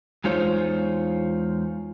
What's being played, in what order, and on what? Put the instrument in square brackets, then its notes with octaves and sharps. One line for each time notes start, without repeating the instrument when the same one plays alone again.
[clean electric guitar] E2 G#3 D#4 F4 C5 C#5